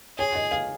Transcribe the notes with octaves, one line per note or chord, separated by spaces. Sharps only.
G#4 C#5
D#5
F5